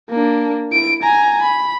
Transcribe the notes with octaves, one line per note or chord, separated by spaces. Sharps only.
A#3 D4
E4 D7
G#5 A#5
B5